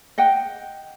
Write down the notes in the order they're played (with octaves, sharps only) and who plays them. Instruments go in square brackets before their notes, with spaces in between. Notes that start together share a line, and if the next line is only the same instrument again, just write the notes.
[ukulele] D#5 F#5 G5